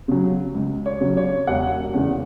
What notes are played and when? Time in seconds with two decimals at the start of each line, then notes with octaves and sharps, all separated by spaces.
0.08 C#3 F#3
0.54 C#2
0.86 C#5
1.01 C#3 F#3
1.17 C#5
1.47 E1 F#5
1.94 E2 C#3 G#3